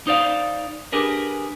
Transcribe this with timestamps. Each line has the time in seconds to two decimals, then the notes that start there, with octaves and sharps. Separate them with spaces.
0.07 D#4 C5 D5 F5
0.92 D4 G4 G#4 A#4 B4